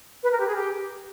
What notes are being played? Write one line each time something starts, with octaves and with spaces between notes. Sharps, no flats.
B4
A#4
G4
G#4
G4